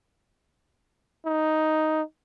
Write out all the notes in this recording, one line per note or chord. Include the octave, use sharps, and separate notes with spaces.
D#4